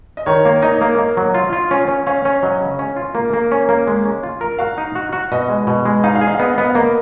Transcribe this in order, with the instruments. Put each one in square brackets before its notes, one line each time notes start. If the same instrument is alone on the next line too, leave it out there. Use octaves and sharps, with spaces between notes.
[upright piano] D#5
[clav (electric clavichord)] D#3 [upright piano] C#5
[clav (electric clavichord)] A#3
[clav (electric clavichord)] D#4 [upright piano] D#5
[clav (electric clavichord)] A#3
A#3
F#3
F4
F4
C#4
C#4
[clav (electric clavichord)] C#4 [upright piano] F5
[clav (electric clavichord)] C#4
[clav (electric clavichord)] F#3 [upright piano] D#5
[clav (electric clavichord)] C#3
C#4
F4
A#3
A#3
C#4
A#3
G#3
C#4
F4
A#4
[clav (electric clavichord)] F#4 [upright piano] F5
[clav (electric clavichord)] D#4
F#4
F#4
[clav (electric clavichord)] B2 [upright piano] D#5
[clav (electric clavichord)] G#3
B2
G#3
[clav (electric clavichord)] D#4 [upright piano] F5
[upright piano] F5
[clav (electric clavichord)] G#4
[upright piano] D#5
F5
[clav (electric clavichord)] B3 [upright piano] D#5
[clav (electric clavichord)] B3
[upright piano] F5
[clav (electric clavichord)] A#3 [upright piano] D#5